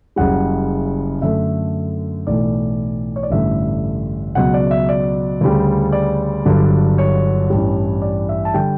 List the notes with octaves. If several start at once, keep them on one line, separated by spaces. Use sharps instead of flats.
F#1 F#2 C#3 G3 F#5
F#2 D3 A3 E5
B1 A2 E3 A3 D5
C#5
D5
A1 G2 D3 A3 E5
C#2 B2 F#3 F#5
D5
E5
D5
D2 C#3 G3
D5
G1 G2 D3 F#3
C#5
A1 G2 E3 G3
D5
E5
A5
D3 G3 G5